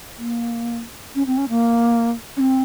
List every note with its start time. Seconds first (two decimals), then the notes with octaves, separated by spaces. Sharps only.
0.17 A#3
1.15 C#4
1.27 C4
1.37 C#4
1.49 A#3
2.37 C#4
2.40 C4